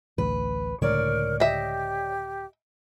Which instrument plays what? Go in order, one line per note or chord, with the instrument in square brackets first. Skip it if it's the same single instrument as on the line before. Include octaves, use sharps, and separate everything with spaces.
[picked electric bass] A1 D2 [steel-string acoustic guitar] B4
[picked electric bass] C#2 A2 D3 [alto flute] A#4 [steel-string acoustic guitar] C#5 D5
[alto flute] G4 [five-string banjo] D#5 E5